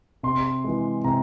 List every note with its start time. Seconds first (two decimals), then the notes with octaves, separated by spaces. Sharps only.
0.23 C3 C6
0.64 E3 G#3
1.04 C3 A#5